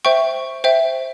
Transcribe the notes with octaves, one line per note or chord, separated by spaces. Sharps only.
C5 E5 G5 C#6
C5 E5 G5